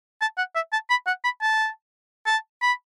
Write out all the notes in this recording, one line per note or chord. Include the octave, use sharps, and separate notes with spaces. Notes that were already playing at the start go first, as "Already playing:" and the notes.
A5
F#5
E5
A5
B5
F#5
B5
A5
A5
B5